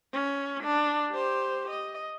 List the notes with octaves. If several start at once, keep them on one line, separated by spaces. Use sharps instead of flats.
C#4
D4
G4 C5
D#5